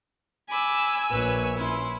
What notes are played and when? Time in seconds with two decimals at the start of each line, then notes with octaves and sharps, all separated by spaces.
0.49 G#5 B5 D6 E6
1.11 A#1 B4 C#5
1.58 C#4 E4 C6